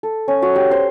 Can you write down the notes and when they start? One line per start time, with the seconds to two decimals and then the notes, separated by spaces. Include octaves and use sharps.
0.03 A4
0.28 C#4
0.42 F#4
0.56 G4
0.71 C5